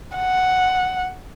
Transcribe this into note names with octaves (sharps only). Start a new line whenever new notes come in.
F#5